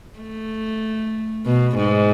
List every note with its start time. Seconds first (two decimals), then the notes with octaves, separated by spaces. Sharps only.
0.19 A3
1.46 B2
1.77 G#2